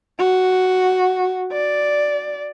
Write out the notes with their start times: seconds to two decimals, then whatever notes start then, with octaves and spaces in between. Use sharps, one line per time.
0.19 F#4
1.52 D5